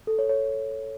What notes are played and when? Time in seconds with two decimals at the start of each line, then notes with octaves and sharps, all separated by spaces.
0.07 A4
0.19 C#5
0.29 C#5